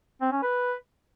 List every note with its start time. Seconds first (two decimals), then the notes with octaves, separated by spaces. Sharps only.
0.21 C4
0.32 C#4
0.43 B4